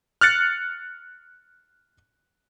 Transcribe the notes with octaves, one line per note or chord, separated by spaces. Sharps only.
F6 F#6 A6 C#7